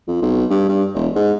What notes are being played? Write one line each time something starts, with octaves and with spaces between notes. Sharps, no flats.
F2
B1
G2
G2
E1
G#2